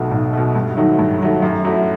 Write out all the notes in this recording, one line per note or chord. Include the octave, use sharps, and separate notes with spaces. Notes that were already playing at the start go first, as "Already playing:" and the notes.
Already playing: B1 B2 A3
B1
B2 A3
G2
D#3 F#3 A3
G2
D#3 F#3 A3
F#2
F#3 A3 E4